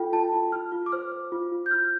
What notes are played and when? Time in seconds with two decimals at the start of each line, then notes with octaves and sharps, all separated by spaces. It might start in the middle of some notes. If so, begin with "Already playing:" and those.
Already playing: F4 A4 G5
0.12 F4 A5
0.33 F4
0.52 F4 F6
0.72 F4
0.86 D6
0.92 C5 F6
1.12 C5
1.32 F4
1.52 F4
1.66 G6
1.71 F4 F6